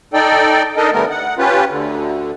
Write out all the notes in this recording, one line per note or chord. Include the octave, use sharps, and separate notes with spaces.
D#4 A4 D5 G5
D4 D#4 A4 A#4 D#5
D3 G3 A3 B3 A#4
F#5
C#4 F4 G4 B4
D2 D3